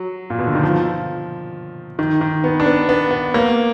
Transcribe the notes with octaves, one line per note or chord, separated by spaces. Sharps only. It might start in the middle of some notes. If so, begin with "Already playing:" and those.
Already playing: F#3
A#2
B2
D3
D#3
F3
D#3
D#3
B3
D4
B3
B3
B3
A#3